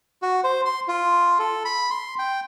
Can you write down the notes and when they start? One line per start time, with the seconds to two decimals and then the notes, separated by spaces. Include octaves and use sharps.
0.22 F#4
0.44 C5
0.65 C6
0.88 F4
1.39 A4
1.65 B5
1.90 C6
2.19 G5